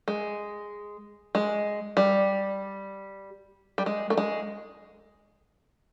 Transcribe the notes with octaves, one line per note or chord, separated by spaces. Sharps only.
G#3
G#3
G3
G3
G#3
A3
G#3